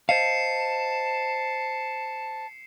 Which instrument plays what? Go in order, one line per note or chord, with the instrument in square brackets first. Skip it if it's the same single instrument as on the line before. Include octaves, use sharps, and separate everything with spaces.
[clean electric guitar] C5 D#5 F5 [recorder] A5 [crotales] C7 C#7 E7